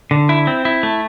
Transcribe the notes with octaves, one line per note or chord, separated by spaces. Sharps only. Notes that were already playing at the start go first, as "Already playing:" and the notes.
D3
E4
C4
E4
A3